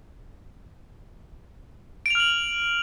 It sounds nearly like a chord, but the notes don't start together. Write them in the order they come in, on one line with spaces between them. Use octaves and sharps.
D7 F7 F6 F#7